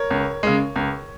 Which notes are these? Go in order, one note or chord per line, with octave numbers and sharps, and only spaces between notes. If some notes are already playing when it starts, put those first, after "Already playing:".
Already playing: A#4 C#5
C#2
C#3 G#3
C#2